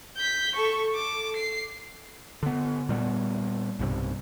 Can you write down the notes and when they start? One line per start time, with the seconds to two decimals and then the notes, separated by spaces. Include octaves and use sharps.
0.17 G6 B6
0.55 A4 C#6
0.92 A4 D6
1.36 C7
2.43 D3 B3
2.89 A#2 G3 B3
3.79 B1 G2 C3